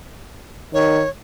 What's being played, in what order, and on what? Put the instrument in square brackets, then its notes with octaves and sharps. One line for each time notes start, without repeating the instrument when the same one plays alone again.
[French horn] D#3 [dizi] C#5